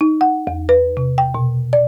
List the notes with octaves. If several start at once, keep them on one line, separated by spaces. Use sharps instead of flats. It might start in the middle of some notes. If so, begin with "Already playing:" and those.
D#4
F#5
E2
B4
C3
G5
B2
D5